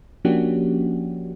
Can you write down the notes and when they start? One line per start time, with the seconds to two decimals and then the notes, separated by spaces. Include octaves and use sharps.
0.25 F3 A#3 C#4 D4 F#4 G4